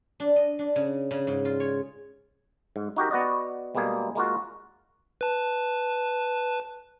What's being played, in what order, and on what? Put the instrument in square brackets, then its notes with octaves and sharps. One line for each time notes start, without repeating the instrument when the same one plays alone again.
[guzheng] D4
D#5
D4
C#3
C#3
G#2
F4
C#5
[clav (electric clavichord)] G#2
D#4 F#4 G4 A#4
B3 F#4 D5 D#5
B2 G3 G#3 A#3 G#4
G#3 A#3 F4 F#4
[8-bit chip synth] B4 A5